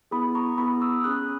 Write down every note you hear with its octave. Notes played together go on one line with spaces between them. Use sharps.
B3 E4 G#4 B5 D#6
A#5 C#6
B3 E4 G#4 B5 D#6
C#6 E6
C#4 G#4 D#6 F#6